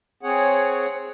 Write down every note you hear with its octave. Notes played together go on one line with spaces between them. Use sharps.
C4 G#4 C#5 F#5